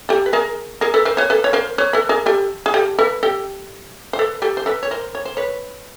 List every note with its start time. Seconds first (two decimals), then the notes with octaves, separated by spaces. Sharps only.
0.09 G4 A4
0.26 B4
0.33 G#4 A#4
0.81 G#4 A#4
0.94 A4 B4
1.05 A#4 C5
1.17 B4 C#5
1.30 A4 B4
1.44 C#5
1.53 A#4 C5
1.78 B4 C#5
1.93 A4 B4
2.09 G#4 A#4
2.26 G4 A4
2.66 G#4
2.74 G4 A4
2.99 A4 B4
3.23 G4 A4
4.13 C5
4.19 A4 B4
4.42 G4 A4
4.57 C5
4.66 A4 B4
4.83 C#5
4.91 A#4 C5
5.15 C#5
5.25 C5
5.37 B4 C#5